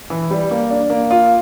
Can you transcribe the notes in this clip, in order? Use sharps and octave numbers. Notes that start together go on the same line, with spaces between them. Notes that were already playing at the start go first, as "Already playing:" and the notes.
E3
G3
A#3
D4
A#3
F4